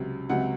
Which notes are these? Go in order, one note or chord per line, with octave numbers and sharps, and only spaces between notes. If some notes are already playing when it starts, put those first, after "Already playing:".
Already playing: C#2 C3 F#3
C#2 C3 F#3 F#5